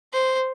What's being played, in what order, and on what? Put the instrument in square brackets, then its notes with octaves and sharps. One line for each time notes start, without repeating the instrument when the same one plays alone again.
[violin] C5